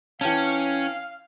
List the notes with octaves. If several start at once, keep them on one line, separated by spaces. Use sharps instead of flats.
E3 C#4 F5 G5 A5